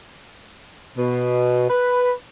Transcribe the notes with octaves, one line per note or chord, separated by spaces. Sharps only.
B2
B4